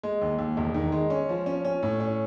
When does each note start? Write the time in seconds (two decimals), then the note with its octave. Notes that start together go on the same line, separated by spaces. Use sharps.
0.03 G#3
0.21 D#2
0.38 D#2
0.57 E1
0.74 D#3
0.92 G#3
1.10 C#4
1.29 F3
1.46 C#4
1.65 C#4
1.83 A2
2.00 C#4